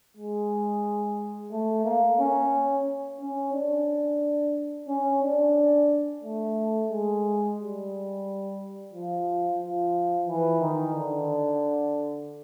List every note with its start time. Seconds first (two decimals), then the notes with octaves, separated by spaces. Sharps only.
0.17 G#3
1.51 A3
1.85 A#3
2.19 C#4
3.20 C#4
3.53 D4
4.88 C#4
5.23 D4
6.24 A3
6.91 G#3
7.58 G3
8.93 F3
9.60 F3
10.28 E3
10.61 D#3
10.94 D3